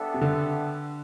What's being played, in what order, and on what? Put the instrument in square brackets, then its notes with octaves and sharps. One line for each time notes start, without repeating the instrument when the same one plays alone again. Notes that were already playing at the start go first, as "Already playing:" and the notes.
Already playing: [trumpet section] G3 B3 D4 A4 E5
[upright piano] C3
D3